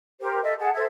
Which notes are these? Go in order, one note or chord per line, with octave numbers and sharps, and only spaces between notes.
G4 A#4 C5
A4 D#5 E5
G#4 F#5 A5
A4 C5 E5 G#6